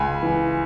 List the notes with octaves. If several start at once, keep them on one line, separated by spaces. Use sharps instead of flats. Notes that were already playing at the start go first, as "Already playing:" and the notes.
Already playing: C#2 G#5 B5
E3